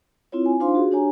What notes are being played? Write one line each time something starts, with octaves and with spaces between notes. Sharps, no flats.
C4 E4 F4 C#5
G#5
D4 D#4 F4 C5 F5 C6
F#4 G#4
D4 G4 C#5 G#5 A#5